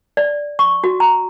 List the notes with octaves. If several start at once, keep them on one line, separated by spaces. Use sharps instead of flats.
D5
C#6
F#4
A#5